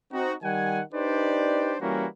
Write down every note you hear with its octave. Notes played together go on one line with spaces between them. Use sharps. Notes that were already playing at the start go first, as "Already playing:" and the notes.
C4 D#4 F#4
D#3 G3 F#5 G#5
D4 D#4 G4 B4 C5 D5
E3 G3 A#3 C#4 E4 F#4